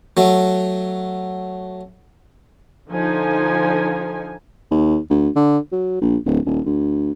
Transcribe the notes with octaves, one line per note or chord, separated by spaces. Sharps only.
F#3 A3
D3 F3 D#4 G#5
D#2
D2
D3
F#3
A#1
D1
D#1
D2